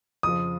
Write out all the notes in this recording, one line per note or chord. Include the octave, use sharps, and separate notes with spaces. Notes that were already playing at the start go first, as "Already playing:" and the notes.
F2 C#3 F3 D#6